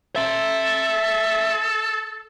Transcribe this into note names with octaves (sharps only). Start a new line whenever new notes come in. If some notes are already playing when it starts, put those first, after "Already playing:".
A4 E5 C6